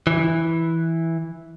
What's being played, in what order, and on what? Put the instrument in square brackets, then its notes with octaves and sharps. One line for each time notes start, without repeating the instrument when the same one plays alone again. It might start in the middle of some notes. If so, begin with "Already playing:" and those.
[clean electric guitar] E3